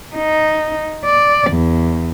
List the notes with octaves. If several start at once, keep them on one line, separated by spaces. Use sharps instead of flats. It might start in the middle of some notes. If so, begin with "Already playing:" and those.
D#4
D5
E2